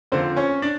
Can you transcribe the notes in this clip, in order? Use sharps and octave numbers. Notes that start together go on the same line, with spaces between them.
F2 D3 F3 A#3 C4 C5
C#4 C#5
D4 D5